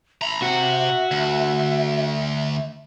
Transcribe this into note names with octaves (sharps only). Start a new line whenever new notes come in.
E5 A#5 B5
C3 F#4
D2